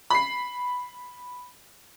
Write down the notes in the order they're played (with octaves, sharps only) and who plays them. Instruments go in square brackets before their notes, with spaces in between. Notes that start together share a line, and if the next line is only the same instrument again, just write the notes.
[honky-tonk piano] B5 C7